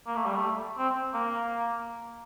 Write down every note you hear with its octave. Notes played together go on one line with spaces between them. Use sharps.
A#3
A3
G3
A3
C4
A#3